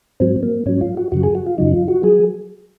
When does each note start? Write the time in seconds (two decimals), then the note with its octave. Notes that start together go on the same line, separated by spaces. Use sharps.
0.20 G#2 F#3 C4
0.43 A#3
0.66 G#2 F#3 C#4
0.81 F4
0.97 F#4
1.12 F#2 C#3 F#3 F#4
1.23 G#4
1.35 F#4
1.46 F4
1.58 F#2 C#3 F#3 D#4
1.74 F4
1.88 F#4
2.03 F#3 G#4